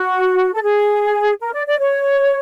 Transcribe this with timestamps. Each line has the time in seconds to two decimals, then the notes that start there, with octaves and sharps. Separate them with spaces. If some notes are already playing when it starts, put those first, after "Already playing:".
Already playing: F#4
0.54 A4
0.62 G#4
1.40 A#4
1.53 D5
1.67 D5
1.79 C#5